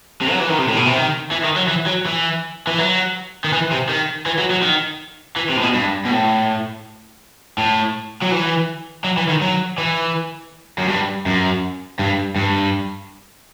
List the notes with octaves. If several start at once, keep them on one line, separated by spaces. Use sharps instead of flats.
C3
F#3
E3
D#3
C3
A2
B2
C3
D#3
E3
D#3
F#3
E3
F#3
E3
E3
F#3
D#3
E3
C3
D#3
E3
F#3
F#3
D#3
E3
C3
A2
B2
G2
B2
A2
A2
F#3
E3
F#3
E3
D#3
F#3
E3
F#2
G2
F#2
G2
G2